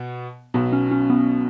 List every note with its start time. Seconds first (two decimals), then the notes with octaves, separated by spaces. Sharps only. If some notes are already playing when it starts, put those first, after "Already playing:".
Already playing: B2 B3
0.54 B1 B2 F#3 B3
0.73 C#4
0.91 C#4
1.10 B3